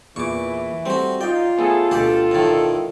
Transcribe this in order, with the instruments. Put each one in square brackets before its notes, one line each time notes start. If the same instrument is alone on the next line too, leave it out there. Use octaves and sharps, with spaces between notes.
[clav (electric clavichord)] E2 A#2 [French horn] E3 [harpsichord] C#6 D6
[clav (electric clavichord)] G3 A3 [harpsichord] C4 F#4
[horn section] D#4 [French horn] F4 [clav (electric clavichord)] D5 D#5 [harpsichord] G5
[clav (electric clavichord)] A3 B3 C#4 [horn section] G#4 A4
[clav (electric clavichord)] D2 B2 [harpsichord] G4 D5 [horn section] A4
[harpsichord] A2 D#3